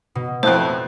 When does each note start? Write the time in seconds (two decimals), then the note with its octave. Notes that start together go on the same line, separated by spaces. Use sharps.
0.15 B2
0.43 F2 A2 C5 F#6